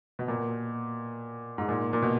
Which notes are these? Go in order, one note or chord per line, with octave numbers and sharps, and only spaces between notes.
B2
A#2
G#2
A#2
A#2
B2